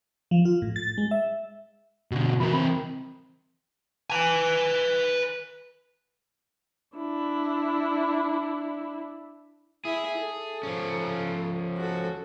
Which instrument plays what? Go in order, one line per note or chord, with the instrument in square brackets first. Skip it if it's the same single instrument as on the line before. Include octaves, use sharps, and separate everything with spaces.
[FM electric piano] F3
F4
A2
A6
G#3
E5
[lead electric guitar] B2 D3 [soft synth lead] F#4
[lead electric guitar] E3 A#4 [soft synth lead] B5
[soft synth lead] C4
[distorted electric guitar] B4 G#5
[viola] D4 E4
[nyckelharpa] E4 E5 [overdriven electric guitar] G#4
[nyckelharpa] A4
[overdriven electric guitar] F3 C#4
[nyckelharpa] F#4 A4